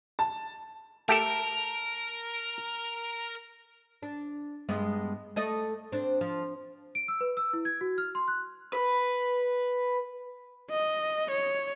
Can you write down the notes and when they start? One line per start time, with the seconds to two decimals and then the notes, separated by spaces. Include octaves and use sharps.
0.19 A5
1.09 A3 G4 A4 A#4 A5 D7
4.02 D4
4.69 G2 G#3 B3
5.36 A3 D5 D#5
5.92 C4 D4
6.21 F3
6.95 D7
7.08 E6
7.21 B4
7.37 E6
7.53 E4
7.65 G#6
7.81 F#4
7.98 F6
8.15 C6
8.28 F#6
8.73 B4
10.70 D#5
11.31 C#5